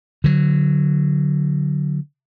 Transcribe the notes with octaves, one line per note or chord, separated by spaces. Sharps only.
D3 F#3